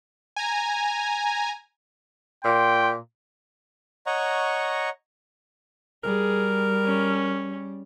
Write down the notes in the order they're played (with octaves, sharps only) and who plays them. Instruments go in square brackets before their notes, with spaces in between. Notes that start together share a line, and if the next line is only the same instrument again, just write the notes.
[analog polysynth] G#5 A#5
[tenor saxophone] A#2 [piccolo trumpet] G5 [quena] C6
[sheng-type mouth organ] C#5 D#5 F#5 A#5 C#6
[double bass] G3 [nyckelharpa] G#4 [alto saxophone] A#4
[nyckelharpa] C#4